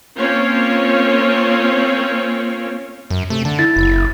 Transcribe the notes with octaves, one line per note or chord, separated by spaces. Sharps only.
A#3 C4 C#4 F4 C#5
F#2
C3 A3
D3 A5
E4 A6
F#1